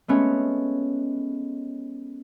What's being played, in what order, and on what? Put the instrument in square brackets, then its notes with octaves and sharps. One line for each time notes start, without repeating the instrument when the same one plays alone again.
[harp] G#3 A3 B3 C#4